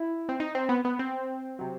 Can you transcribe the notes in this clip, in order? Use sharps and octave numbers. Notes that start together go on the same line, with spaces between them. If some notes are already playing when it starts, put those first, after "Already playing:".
Already playing: E4
C4
D#4
C4
B3
B3
C4
C3 F#3